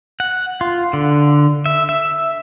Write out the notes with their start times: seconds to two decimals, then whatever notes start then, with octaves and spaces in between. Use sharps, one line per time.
0.20 F#5
0.61 F4
0.93 D3
1.66 E5
1.89 E5